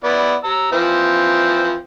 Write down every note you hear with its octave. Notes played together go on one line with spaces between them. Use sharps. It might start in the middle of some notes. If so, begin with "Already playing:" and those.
B3 E4 D5
A#5 E6
E3 F3 C4